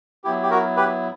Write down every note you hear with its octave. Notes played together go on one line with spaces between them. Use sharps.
F#3 B3 E4 G4
G4
F#4 A#4
G4 B4